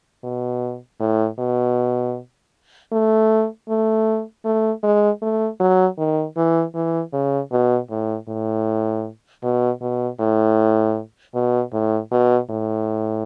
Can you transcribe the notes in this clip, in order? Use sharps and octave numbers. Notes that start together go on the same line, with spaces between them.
B2
A2
B2
A3
A3
A3
G#3
A3
F#3
D#3
E3
E3
C#3
B2
A2
A2
B2
B2
A2
B2
A2
B2
A2